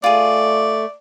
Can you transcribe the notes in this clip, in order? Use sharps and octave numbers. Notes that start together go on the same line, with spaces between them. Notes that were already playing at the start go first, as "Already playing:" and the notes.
A3 F4 G#4 D5